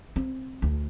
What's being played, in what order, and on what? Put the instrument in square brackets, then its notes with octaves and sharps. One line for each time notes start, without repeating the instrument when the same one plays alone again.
[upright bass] C4
D2